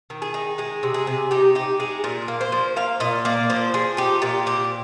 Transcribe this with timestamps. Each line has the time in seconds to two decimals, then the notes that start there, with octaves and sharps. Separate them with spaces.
0.10 D#3
0.22 G#4
0.34 D#4
0.58 G#3 G#4
0.83 C3
0.94 G#4
1.07 C3
1.31 D#4 G4
1.55 D#4 G4
1.80 G#3 G#4
2.04 A#2 A#4
2.28 A#3
2.41 C5
2.52 F3
2.76 A#3 F5
3.00 A#2 D#5
3.25 A#3 D5
3.50 F3 C5
3.74 F3 G#4
3.97 D#4 G4
4.22 A#2 G4
4.46 C4 G4